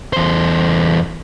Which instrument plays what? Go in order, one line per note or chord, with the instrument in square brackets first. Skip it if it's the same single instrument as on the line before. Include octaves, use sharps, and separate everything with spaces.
[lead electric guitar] E2 C5